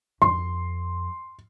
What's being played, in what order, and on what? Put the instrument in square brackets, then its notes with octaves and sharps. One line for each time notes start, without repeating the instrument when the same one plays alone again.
[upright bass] F2 [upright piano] C6